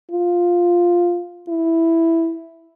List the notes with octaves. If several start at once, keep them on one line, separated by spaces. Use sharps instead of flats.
F4
E4